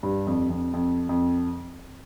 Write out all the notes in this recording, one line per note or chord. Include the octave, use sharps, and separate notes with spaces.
G2
F2
F2
F2
F2